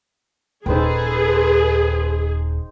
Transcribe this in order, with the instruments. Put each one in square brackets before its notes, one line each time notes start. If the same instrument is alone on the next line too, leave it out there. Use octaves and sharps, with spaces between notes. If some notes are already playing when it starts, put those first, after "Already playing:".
[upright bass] D#1 [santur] D#4 C5 G5 [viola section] G#4 [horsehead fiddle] A4 B4